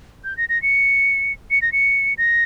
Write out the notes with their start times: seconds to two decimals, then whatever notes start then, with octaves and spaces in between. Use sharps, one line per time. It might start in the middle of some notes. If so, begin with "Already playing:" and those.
0.24 G6
0.37 A#6
0.49 A#6
0.62 C#7
1.51 C#7
1.62 A#6
1.72 C#7
2.18 A#6